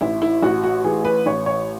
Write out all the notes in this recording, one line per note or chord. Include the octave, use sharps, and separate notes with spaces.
A1 E4
E4
A1 F#4
F#4
E3 G#4
B4
A1 C#5
C#5